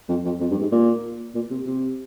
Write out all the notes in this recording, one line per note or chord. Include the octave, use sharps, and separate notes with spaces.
F2
F2
F2
G2
G#2
A#2
A#2
C3
C3